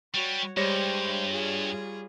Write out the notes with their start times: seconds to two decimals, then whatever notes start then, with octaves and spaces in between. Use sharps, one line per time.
0.14 G3 F#4 C#5
0.57 G2 G3 G#3 C5 C#5 A#6
1.31 F4 G#4